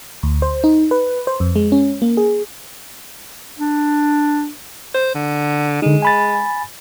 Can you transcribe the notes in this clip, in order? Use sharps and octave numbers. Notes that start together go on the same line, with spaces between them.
D2
C5
D#4
B4
C5
F2
G#3
C#4
A#3
G#4
D4
C5
D3
D3 G#3 D#4
G#5 B5 A6